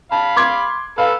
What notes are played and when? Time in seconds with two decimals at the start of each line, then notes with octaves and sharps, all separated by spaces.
0.12 F5 A5 B5
0.36 C6 D6 G#6
0.98 A4 B4 F5